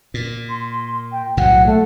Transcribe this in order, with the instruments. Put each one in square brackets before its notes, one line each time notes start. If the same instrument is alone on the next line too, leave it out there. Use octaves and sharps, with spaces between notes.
[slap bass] A#2
[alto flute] C6
G5
[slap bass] B1 A2 F#3 [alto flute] F#5
[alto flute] A3